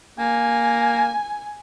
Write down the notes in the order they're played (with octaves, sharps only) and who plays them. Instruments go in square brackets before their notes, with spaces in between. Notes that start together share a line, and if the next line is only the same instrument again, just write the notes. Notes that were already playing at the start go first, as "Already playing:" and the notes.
[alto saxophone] A#3 [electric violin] G#5